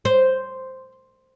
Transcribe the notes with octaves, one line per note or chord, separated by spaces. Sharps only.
C5